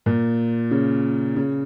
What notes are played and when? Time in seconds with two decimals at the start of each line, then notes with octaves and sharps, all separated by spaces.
0.06 A#2
0.71 C#3
1.36 C#3